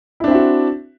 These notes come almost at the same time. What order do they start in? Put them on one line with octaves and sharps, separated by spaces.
E4 D4 C4 E5 F#4